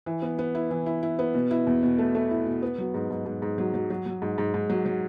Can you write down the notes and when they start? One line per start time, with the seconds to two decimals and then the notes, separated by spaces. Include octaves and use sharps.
0.06 E3
0.22 B3
0.39 B3
0.55 E4
0.71 E3
0.86 E4
1.03 E4
1.19 B3
1.34 B2
1.51 E4
1.67 E2
1.83 B2
1.98 A3
2.15 A3
2.31 E4
2.46 B2
2.62 B3
2.78 F#3
2.94 G#2
3.10 G#2
3.26 G#2
3.42 G#2
3.58 F#3
3.74 F#3
3.90 F#3
4.06 F#3
4.22 G#2
4.38 G#2
4.54 G#2
4.70 F#3
4.86 F#3